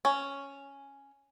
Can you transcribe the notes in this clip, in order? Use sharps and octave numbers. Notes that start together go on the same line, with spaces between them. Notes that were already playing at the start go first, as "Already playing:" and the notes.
C#4